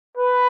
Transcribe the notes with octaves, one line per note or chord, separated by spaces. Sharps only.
B4